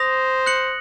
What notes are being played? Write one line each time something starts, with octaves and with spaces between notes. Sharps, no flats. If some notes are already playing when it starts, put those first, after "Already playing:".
Already playing: C5 D#6 A#6 F7
F#6 C#7 F#7